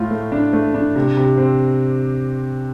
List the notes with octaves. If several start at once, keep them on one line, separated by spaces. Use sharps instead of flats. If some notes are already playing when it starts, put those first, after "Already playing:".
Already playing: A2 F4
A3
D4
A3
D4
C3
C3
C4